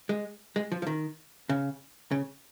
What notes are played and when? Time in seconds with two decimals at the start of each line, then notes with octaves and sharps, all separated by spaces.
0.09 G#3
0.56 G#3
0.72 F3
0.82 F3
0.87 D#3
1.49 C#3
2.11 C#3